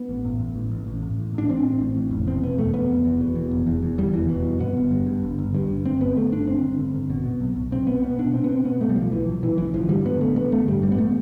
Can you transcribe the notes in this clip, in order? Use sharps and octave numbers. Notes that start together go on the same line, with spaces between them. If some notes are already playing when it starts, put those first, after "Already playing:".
Already playing: B3
A1
A2
A2
A1
A1
A1
A2
A1
A2 D4
A1 C4
A1
A2
A1
F1
B2 C4
E2 B3
F1 A3
F1 B3
F1
E2
B2
E2
F1
E2
E2
E2 G3
F1 E3
B2
F1
G2 B3
G1
G2
G2
G1
G1
G2
G1
G1 C4
G1 B3
G1 A3
G2 D4
G1 C4
G1
G1
G1
B2
B2
B1
B1
B1 C4
B2 B3
B2 B3
B2 D4
B2 C4
B3
B2 C4
B2 B3
B2 A3
G3
B1 F3
B1 E3
B1
B1 E3
A1 E3
D3 F3
G2 G3
D3 B3
A1 A3
A1 B3
D3 A3
G2 G3
A1 G3
B3
A3